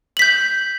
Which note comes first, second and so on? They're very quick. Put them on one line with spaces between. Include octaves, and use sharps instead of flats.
F#7 B6 G6